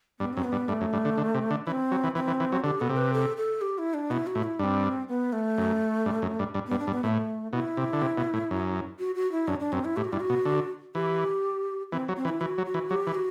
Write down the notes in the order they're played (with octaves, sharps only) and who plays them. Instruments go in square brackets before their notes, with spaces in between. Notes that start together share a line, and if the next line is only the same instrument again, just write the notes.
[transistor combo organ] G2 [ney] B3
[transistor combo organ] F#2 [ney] C4
[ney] B3
[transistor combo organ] G2
[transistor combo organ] G2 [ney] A3
[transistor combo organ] F#2
G2
D3
D3
C3
D3
[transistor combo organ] E3 [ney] D4
[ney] C4
[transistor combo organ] F#3
E3
[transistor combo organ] E3 [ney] C4
[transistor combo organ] E3
E3
F#3
[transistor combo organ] D3 [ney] G4
[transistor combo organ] B2 [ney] A4
[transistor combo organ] C3
[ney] B4
A4
A4
G4
E4
D4
[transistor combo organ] B2 [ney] E4
[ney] F#4
[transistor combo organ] A2
[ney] E4
[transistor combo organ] G2 [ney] D4
[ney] C4
B3
A3
[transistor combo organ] F#2
G2
F#2
G2
G2
[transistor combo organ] G2 [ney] B3
[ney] D4
[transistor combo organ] G2
[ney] B3
[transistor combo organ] A2 [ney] B3
[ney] A3
[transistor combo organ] B2 [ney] E4
[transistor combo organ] C3
D3
C3
B2
A2
F#2
[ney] F#4
F#4
E4
[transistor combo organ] F#2 [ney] D4
[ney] D4
[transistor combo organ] F#2 [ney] C4
[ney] E4
[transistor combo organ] A2 [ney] G4
[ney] F#4
[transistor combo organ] G2 [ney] E4
[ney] F#4
[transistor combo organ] B2
D3
[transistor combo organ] E3 [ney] G4
[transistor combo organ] E3 [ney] C4
[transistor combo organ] F#3
[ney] C4
[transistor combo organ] E3
[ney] E4
[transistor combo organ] E3 [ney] F#4
[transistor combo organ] F#3
[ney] F#4
[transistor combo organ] E3
[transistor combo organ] F#3 [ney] G4
[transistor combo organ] E3
[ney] F#4